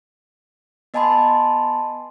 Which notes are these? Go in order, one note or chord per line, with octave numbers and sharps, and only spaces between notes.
B3 D#5 G#5 A5 B5 C6